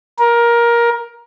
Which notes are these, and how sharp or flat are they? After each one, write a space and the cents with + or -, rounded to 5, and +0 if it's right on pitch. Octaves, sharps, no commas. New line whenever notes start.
A#4 +15